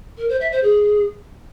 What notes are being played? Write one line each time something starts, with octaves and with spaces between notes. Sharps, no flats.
A#4
C5
E5
C5
G#4